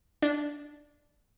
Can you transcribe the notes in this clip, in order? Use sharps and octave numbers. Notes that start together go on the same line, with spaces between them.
D4